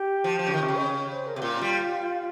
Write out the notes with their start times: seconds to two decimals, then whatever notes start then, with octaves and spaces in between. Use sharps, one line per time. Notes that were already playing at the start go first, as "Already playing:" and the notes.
Already playing: G4
0.24 F3
0.39 F3
0.47 C#3
0.54 D#3
0.62 C3
0.68 C#3
0.77 D#5
0.83 C#5
0.98 C#5
1.12 C5
1.27 A#4
1.36 C3 G4
1.42 A#2 F4
1.61 G3